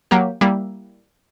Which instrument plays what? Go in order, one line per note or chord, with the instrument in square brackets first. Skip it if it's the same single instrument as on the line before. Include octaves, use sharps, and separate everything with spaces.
[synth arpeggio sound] F#3 A#3 G4
G3 A#3 E4